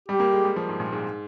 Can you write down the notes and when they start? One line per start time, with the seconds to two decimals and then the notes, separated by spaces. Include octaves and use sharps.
0.08 G3 G4
0.20 A#3
0.33 G#3
0.45 G3
0.56 F3
0.69 G#2
0.80 A#2
0.92 G#2